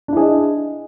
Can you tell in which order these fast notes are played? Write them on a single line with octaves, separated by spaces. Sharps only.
D4 E4 G#4 D#5